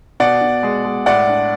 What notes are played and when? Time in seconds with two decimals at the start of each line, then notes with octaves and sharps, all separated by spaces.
0.20 B2 D5 F#5
0.41 B2
0.63 G#3
0.85 G#3
1.06 A2 D5 F#5
1.28 D4